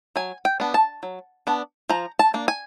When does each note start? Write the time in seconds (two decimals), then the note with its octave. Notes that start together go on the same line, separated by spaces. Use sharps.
0.16 F#3 G#5
0.45 G5
0.60 B3 D4
0.74 A5
1.03 F#3
1.47 B3 D4
1.89 F3 A#5
2.19 A5
2.34 A#3 D4
2.48 G#5